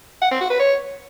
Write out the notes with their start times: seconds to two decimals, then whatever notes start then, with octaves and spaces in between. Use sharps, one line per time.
0.22 F#5
0.31 C4
0.41 F#4
0.50 B4
0.60 C#5